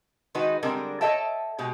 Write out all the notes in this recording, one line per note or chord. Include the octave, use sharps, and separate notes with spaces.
D#3 G#3 D#4 F#4 B4
D3 G3 G#3 C4 A#4
A4 C#5 D#5 E5 G5 A5
B2 G#3 G4